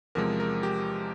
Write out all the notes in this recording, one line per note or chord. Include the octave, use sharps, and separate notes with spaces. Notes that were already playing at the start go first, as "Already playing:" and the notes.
E2 C3 F3 G#3 A#4
A#4
G4